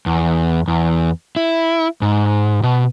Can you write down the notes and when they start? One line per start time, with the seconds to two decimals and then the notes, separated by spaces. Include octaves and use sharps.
0.06 E2
0.68 E2
1.36 E4
2.02 G#2
2.63 B2